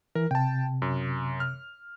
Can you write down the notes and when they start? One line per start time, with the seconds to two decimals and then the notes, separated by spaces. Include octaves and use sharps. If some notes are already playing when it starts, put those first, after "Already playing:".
0.15 E3 A#4
0.31 C3 G5 A5
0.82 F#2
1.40 F6